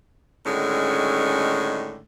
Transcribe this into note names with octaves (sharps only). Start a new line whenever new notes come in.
A2 D3 D#3 G#3 C#4